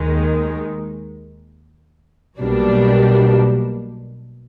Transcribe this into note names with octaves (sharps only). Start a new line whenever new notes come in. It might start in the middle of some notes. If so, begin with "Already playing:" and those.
Already playing: D#2 D#3 G#3
B1 B2 G3 A#3 D4